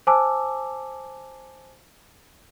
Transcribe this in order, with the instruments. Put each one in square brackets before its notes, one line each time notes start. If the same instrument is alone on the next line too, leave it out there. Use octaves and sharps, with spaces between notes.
[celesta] C5 G#5 A5 D6 E6